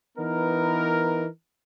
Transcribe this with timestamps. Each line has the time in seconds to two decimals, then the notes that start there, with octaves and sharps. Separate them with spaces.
0.17 E3 B3 D#4 A#4